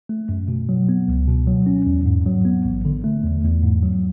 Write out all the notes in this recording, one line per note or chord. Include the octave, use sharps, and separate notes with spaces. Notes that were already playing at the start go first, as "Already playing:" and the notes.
A3
F#2
B2
F#3
B3
C#2
B2
F#3
C#4
E2
G#2
F#3
B3
A1
D3
A3
E2
E2
G#2
F#3